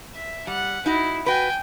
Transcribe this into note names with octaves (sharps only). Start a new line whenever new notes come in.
E5
G3 F#5
D#4 E4 F#4
F#4 B4 G5 G#5